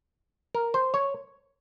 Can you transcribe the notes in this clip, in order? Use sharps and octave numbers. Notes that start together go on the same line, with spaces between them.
A#4
C5
C#5